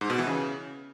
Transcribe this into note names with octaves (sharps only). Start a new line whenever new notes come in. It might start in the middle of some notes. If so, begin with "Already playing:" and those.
G#2
B2
E3
C#3